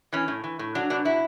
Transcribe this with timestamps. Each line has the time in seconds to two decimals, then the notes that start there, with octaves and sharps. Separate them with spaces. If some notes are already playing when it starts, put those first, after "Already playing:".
0.13 E3 C#4
0.28 A2
0.44 E3
0.59 A2
0.75 F#3 D4
0.90 B2 D4
1.05 F#3 E4